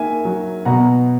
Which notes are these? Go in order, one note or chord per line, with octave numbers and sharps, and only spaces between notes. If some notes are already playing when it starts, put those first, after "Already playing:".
Already playing: D#3 A#3 E5 G#5
F#3
B2 F#5 A#5